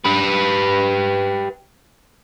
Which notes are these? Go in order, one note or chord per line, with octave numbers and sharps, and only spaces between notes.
G4 B4